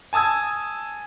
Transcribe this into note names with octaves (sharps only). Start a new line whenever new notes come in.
G#5 A5 D#6 E6 G#6